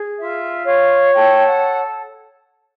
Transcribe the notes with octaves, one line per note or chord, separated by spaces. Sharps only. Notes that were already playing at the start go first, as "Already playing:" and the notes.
Already playing: G#4
F4 E5
C#5 F5
A4 G5
F#5